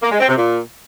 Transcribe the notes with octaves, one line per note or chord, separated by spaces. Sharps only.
A#3
G#3
C4
C3
A#2